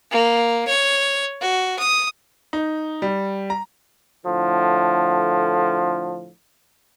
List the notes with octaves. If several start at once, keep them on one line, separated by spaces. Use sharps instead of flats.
A#3
C#5
F#4
D#6
D#4
G3
A#5
A2 D3 F3